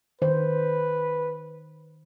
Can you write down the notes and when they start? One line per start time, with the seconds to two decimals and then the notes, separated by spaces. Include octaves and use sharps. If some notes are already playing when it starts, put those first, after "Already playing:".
0.22 D#3 B4 C5